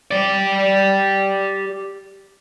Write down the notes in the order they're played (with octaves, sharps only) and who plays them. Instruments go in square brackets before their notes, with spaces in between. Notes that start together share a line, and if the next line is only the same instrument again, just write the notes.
[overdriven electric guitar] G4 D5